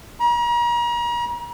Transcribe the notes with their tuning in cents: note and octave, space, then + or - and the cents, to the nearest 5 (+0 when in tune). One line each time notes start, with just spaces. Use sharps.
A#5 +40